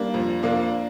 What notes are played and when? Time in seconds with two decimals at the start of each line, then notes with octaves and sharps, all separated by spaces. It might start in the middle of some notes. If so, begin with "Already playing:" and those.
Already playing: G3 A#3 D4
0.14 F2
0.43 F2 A#3 D4